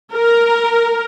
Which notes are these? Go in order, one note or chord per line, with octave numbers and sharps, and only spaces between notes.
A#4